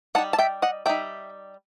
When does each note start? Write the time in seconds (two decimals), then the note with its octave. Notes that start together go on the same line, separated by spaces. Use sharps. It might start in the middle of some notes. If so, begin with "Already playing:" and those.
0.15 D#4 F#5 A5
0.18 G3
0.33 A5
0.38 E5 G5
0.62 D#5 F#5
0.86 G3 D#4 E5 G5